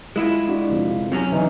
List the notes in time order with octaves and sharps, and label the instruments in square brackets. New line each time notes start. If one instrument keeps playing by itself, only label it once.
[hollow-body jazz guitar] G#3 E4 F4
[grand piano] D4 F#4
F1 F3
[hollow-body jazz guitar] C3 F#3 C#4
[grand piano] E3 C4 D#4